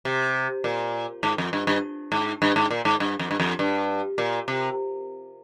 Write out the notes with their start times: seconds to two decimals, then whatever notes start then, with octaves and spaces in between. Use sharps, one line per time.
0.05 C3
0.64 A#2
1.23 G#2
1.38 F2
1.53 G2
1.67 G2
2.12 G#2
2.42 G2
2.56 G#2
2.71 A#2
2.85 G#2
3.00 G2
3.19 F2
3.31 G2
3.40 F2
3.59 G2
4.18 A#2
4.48 C3